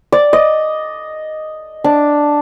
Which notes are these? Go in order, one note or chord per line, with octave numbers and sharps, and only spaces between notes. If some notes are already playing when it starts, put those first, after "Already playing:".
D5
D#5
D4